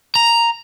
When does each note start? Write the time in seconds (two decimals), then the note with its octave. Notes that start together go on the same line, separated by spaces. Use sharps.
0.15 A#5